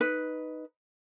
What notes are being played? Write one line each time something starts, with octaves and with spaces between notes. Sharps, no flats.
D#4 B4